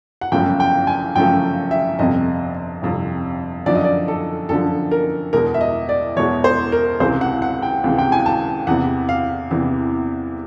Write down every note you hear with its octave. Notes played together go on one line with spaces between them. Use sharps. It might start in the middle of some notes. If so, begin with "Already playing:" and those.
F#5
G1 F#2 C#3 F3 A3 G5
G5
G#5
G1 F#2 C#3 F3 A3 G5
E5
G1 F2 C3 D#5
G1 F2 C3
F#2 D3 F3 D5
D#5
D5
A4
F#2 D3 F3 A4
A#4
E2 B2 G#3 A#4
E5
D#5
D5
E2 B2 G#3 C#5
C5
A#4
C#2 C3 E3 G#3 C5
F#5
F#5
G5
C#2 C3 E3 G#3
G5
G#5
A5
E2 C3 E3 F#5
F5
E2 C3 E3